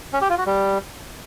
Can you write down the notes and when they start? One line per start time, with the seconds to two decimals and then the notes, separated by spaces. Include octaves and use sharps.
0.13 C#4
0.21 G4
0.30 F4
0.38 F#4
0.46 G3